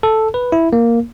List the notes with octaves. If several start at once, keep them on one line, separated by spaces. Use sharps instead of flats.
A4
B4
E4
A#3